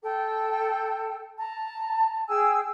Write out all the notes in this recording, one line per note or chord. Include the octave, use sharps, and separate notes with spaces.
A4 G5
A5 A#5
G#4 G5 G#5 E6